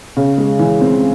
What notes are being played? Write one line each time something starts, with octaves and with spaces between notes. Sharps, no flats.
C#3
G#3
E3
C4